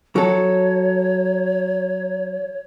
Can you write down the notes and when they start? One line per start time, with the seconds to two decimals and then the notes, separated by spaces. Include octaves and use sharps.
0.16 F#3 A4 C#5